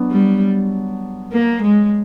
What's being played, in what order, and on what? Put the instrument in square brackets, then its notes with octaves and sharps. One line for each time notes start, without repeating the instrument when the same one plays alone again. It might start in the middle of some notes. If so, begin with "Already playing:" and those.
Already playing: [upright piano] F#3 B3 D4
[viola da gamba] G3
A#3
G#3